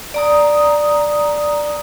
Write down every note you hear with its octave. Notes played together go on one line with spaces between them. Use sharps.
D5 A#5 D#6